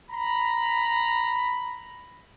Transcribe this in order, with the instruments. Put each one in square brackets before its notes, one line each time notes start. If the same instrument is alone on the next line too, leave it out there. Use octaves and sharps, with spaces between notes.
[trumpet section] A#5 B5